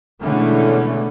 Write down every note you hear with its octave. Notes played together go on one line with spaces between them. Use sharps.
B2 D3 E3 G#3 A3 C#4